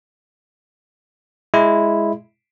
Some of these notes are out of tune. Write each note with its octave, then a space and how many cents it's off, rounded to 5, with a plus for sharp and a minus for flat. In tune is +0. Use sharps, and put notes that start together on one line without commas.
G#3 +0 E4 +0